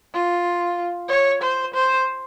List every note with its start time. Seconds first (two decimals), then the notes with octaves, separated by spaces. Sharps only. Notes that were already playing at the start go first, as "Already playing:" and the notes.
0.14 F4
1.09 C#5
1.42 C5
1.74 C5